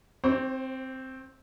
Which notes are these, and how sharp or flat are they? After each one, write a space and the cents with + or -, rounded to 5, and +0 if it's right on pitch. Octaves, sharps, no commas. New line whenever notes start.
C4 +0 C5 +35 C#6 +45